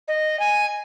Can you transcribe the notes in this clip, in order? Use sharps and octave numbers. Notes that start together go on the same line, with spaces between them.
D#5
G#5